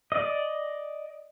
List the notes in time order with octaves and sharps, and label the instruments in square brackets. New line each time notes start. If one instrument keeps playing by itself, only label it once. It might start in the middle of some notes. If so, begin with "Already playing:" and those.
[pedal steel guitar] D5 D#5